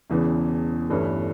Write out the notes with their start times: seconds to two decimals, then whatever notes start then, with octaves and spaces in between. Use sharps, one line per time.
0.10 E1 E2 C#3 E3
0.90 G1 G2 E3 A3 C#4